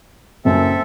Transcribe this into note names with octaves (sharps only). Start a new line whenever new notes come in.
F#1 F#2 C4 A4 E5